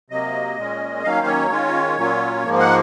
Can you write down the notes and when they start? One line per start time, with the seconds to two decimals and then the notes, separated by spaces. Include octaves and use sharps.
0.10 C3 F#3 A#3 D#5
0.57 A#2 G#3 C#4
1.04 D#3 F#3 A#3 C#4 F5
1.22 C5
1.27 C#5
1.50 D#3 G#3 C#4 F4
1.97 A#2 F#3 C#4 F4
2.43 G#2 F3 A#3
2.59 F#5